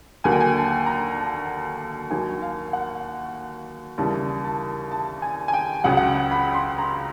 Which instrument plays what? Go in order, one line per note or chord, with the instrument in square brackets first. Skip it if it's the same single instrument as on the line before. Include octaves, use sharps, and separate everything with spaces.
[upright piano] D#2 D3 F#3 A#3 G#5
G5
G#5
A5
A#5
A5
D#2 D#3 F#3 G#5
F5
F#5
D#2 C#3 E3 G3 A5
A5
A5
G#5
G#5
G5
C#2 C#3 F#3 F#5
F#5
G5
B5
C6
A#5